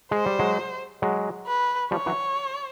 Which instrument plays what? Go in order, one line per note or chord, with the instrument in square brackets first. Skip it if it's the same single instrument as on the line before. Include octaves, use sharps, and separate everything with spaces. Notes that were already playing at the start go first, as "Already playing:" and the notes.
[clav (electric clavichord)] G#3 [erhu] C5
[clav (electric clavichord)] G3
F#3 G#3
F#3 G#3
[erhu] B4
[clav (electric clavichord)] F3 G3 [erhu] C#5
[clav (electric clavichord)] E3 F#3